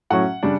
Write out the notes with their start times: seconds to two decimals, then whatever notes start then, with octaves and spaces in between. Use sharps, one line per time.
0.10 A2 F#3 C#4 F#5
0.43 C#3 G3 D4